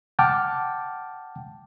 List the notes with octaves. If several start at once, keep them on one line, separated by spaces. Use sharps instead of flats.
F#5 G5 A5 D6 F6